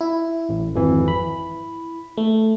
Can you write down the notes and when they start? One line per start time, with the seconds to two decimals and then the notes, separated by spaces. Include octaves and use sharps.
0.01 E4
0.49 A1
0.75 G#1 F2 E3
1.08 B5
2.17 A3